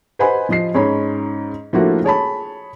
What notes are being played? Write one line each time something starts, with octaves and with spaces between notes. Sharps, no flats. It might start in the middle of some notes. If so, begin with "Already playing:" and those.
B4 C5 D#5 F#5 G#5 B5
F3 D#5 C7
G#2 C#4 D#4 C#5 B5
F3 A3 A#3 D4 E4 F#4
G#4 C#5 A5 B5